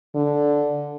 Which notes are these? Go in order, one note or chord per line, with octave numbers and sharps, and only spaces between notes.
D3